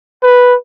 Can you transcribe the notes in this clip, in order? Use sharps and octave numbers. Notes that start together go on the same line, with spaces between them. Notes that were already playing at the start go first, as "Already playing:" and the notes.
B4